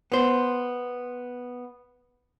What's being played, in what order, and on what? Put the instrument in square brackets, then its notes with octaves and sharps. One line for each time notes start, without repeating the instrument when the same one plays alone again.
[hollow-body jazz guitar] B3 C5